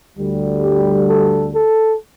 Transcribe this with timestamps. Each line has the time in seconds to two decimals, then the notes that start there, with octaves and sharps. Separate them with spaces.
0.17 D2 D3 G3
0.63 G4
1.08 A4
1.55 A4